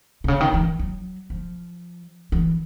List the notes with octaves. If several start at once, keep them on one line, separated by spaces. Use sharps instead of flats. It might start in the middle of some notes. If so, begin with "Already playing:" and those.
C3
C#3
D#3
E3
F#3
F3
E3